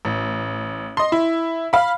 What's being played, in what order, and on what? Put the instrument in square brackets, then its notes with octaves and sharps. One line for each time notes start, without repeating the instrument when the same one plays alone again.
[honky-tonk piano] A1
D#5 C6
E4
F5 B5